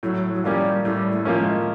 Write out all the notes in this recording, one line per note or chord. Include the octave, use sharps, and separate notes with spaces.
A2 F#3
F#3
F3 G3 A#3 C#4
A2 G3
A3
F3 A#3 C#4
G#3